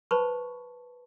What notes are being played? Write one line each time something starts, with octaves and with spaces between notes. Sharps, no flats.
B4 C5 A5 B5 C#6